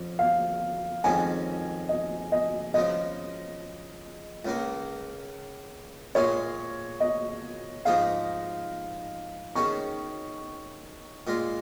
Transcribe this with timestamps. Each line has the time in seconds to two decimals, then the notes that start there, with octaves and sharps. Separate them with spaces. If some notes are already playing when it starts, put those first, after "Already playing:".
Already playing: F2 F3 C#4
0.19 F5
1.04 F2 D#3 G#3 C#4 G#5
1.89 D#5
2.32 D#5
2.74 C#3 F3 G#3 D#5
4.45 C#2 C#3 A#3
6.15 A#2 G#3 F4 G#4 C#5
7.00 D#5
7.85 G#2 F3 G#3 D#4 G#4 F5
9.55 D#3 C#4 G#4 C#6
11.27 A#2 G#3 F4